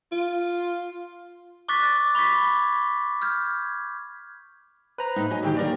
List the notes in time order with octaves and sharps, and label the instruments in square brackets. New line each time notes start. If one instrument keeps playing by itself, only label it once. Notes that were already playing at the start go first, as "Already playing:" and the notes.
[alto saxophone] F4
[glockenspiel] C#6 D6 F#6 A6 B6
B5 C#6 D6 G#6 B6
F6 G6 G#6
[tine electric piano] B4 C5 A#5
[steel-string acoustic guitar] A2 D#4
[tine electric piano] F#3 [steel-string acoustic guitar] D#5 G#5
[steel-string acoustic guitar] D3 D#3 G4
D#2 A#4 D5